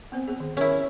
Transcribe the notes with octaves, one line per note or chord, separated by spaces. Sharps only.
B3 C4 C5
B3 G#4
D#3
C#4 E4 A#4